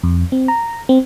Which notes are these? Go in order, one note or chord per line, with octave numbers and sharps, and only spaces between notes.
F2
C4
A#5
C4